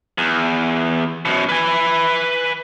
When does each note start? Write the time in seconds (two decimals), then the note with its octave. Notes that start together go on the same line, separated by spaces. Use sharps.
0.18 E2
1.25 F#2 B2
1.49 B4 G#5